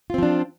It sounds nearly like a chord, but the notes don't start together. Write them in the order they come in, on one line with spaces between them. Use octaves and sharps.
F4 C4 F3 D4